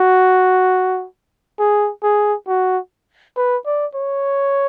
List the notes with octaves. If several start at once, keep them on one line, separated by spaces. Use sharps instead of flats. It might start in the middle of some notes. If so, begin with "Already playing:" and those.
Already playing: F#4
G#4
G#4
F#4
B4
D5
C#5